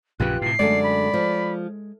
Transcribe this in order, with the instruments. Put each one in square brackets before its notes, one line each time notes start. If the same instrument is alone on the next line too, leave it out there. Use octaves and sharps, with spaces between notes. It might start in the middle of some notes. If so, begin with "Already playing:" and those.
[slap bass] A#1 F#2 C#3 [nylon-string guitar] F4 G4 B4 [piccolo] F#6
[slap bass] A2 C3 [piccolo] C7
[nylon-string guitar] F#2 D3 A3 [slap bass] G#3 [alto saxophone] D5
[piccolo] B5
[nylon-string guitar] F3